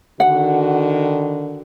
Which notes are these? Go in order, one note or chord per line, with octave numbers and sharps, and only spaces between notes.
D3 D#3 F#4 F#5